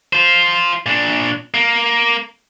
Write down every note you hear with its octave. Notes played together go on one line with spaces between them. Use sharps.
F4 C5
A#2 D4
A#3